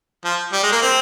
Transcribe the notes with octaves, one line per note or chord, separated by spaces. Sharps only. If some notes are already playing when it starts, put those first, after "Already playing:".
F3
G3
G#3
A#3
C4